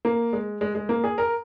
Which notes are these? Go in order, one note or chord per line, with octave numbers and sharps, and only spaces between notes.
A#3
G#3
G#3
G#3
A#3
G#4
A#4